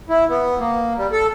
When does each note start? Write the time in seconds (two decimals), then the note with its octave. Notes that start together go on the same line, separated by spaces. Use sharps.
0.09 E4
0.29 B3
0.59 A#3
0.97 G3
1.12 A4